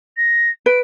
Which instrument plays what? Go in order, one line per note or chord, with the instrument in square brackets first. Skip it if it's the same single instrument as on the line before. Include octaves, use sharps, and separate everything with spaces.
[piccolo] A#6
[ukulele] B4 [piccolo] D7